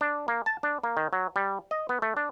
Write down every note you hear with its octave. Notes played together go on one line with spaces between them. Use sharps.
D4
A#3
A5
D4
A#3
D#3
F#3
G3
D#5
B3
A3
D4